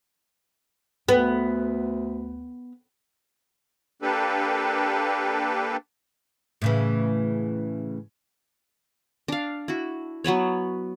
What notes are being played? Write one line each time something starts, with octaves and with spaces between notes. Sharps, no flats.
D2 B3
A#3 D4 G4 A4 B4
A2 C#3 E3
D4 F5
E4 F#4
F#3 B3 B4 C#5